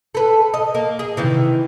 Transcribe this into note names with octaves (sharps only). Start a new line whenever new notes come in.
A4 B4
D#5
A#3
G#4
C3 D#3 E3